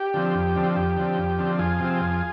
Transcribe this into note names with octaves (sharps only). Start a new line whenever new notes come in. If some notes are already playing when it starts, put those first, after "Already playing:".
Already playing: G4
D3 F3 C4
F2
D3 F3 C4
F2 G4
D3 F3 C4
F2
D3 F3 C4
F2 F4 G#4
C3 F3 C4
F2